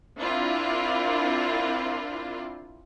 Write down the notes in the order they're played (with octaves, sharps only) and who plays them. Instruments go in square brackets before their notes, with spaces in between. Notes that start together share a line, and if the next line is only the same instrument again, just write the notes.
[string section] C4 D4 E4 F4 A#4